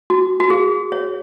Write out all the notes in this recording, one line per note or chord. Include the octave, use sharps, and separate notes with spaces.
F#4
F#4
G#4
C#5